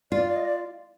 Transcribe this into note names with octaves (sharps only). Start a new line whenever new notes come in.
F4 D5
D5
D#5
D5